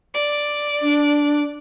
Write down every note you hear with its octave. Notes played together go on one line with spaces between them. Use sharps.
D5
D4